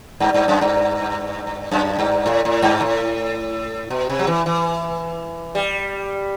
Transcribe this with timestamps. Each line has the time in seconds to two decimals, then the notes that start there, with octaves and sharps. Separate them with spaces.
0.20 G2
0.34 G2
0.48 F#2
0.61 G2
1.71 F#2
1.99 G2
2.26 A2
2.45 A2
2.62 G2
2.81 A2
3.90 B2
4.10 C3
4.19 F#3
4.27 E3
4.46 E3
5.55 G3